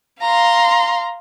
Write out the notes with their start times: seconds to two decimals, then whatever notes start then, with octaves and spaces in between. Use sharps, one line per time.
0.21 F5 A#5 C6